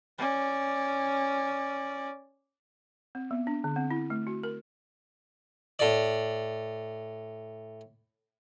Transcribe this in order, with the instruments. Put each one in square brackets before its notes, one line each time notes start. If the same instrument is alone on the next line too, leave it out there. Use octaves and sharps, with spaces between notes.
[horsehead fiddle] C#4 D5
[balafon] C4
B3
D4
D3
C4
E4
A3
F#4
A#4
[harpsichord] A2 D5